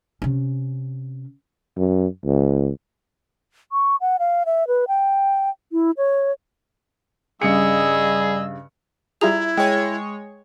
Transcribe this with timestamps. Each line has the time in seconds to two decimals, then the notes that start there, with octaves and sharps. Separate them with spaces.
0.22 C3 C#4
1.77 F#2
2.25 C#2
3.72 C#6
4.01 F#5
4.19 F5
4.46 E5
4.68 B4
4.88 G5
5.72 E4
5.97 C#5
7.42 G2 C#3 G3 G#4 D#5 E6 C#7
9.21 G3 E4 F4 G#4 E5 A#5 F7
9.57 G#3 C#5 G5